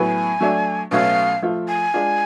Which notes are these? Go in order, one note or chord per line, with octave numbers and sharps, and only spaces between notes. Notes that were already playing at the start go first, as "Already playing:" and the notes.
Already playing: A2 F#3 B3 G#5
F#3 A3 D4
B2 F#3 A3 C#4 F5
F3 A3 F4
G#5
G#3 D4 F4